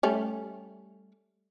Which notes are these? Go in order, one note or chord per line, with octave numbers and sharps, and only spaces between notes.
G3 A3 C#4